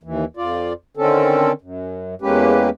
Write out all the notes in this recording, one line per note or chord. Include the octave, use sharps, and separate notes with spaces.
D#2 E3
F2 F4 D5
D3 D#3 C4 C#4 A4
F#2
E2 G#3 A#3 C#4 G4 B4